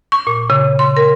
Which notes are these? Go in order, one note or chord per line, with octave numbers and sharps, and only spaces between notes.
C#6
A#2
C#3
C6
A#4